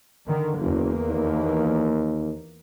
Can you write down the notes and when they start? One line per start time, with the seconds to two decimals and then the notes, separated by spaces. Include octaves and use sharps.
0.27 D3 D#3
0.59 F#1 E2 A#3
1.08 D#2